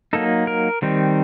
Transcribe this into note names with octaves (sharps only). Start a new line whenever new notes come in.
F#3 A#3 D#4 A4
A#4
D#3 G3 C4 D#4